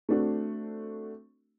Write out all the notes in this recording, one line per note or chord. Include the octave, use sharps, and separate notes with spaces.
A3 C4 D4 F#4